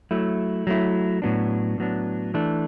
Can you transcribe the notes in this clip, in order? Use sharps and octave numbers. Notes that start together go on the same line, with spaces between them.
F#3 A3 E4
F#3 A3 E4
A2 F#3 B3 D4
A2 F#3 B3 D4
E3 A3 D4